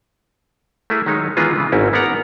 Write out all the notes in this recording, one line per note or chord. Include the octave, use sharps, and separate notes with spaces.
A3 A#3 E4 G#4
D#3 F#3 G#3 D#4 C#5
D#3 E3 G#3 B3 F4 G#4
C#3 E3 G#3
G#1 G#2 C4 C#4 E4
A#3 B3 A#4 F#5 A#5